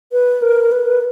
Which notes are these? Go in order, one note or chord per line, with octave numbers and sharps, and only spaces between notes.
B4
A#4
B4